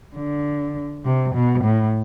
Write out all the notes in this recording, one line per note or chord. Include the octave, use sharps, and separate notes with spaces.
D3
C3
B2
A2